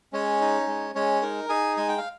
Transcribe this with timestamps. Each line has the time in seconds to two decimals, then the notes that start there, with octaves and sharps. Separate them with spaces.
0.13 G#3 C#4 C#5
0.41 D#4
0.67 G#3
0.95 G#3 C#4 C#5
1.22 D#4 A#4
1.49 D#4 G#4 G#5
1.77 G#3 G#5
1.88 G5
1.98 F5